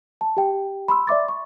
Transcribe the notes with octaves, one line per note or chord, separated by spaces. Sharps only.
A5
G4 G5
B5 C6 E6
D5 E5 D6 A6
C#6